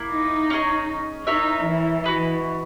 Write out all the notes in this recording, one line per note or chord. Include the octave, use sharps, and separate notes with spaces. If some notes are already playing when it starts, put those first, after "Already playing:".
Already playing: A#3 E4
D#4
C#4 G#4 D#5
D#4 E4 A#4 C#5 E5
E3
F#4 B4 D#5